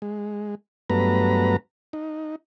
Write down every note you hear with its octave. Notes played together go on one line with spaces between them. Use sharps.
G#3
G2 F#3 A3 B3 B4 A#5
D#4